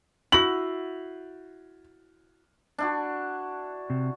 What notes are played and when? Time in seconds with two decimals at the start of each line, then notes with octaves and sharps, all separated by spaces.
0.32 E4 F#4 F#7
2.78 D4 E4 F#4
3.90 C3